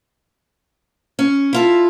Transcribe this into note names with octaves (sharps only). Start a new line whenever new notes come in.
C#4
E4 F4 A4